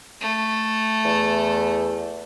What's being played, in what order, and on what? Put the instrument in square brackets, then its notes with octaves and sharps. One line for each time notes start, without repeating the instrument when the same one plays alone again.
[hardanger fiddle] A3
[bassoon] E2